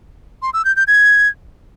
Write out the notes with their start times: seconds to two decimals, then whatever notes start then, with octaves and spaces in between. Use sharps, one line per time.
0.42 C6
0.54 E6
0.65 G6
0.76 G6
0.88 G#6